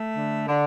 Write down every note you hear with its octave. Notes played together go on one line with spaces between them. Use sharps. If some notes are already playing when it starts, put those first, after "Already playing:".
Already playing: A3
D3
D3